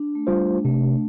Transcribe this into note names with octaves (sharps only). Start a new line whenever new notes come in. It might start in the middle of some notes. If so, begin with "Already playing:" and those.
Already playing: D4
A3
G3 F4 C5
A3
C3 A3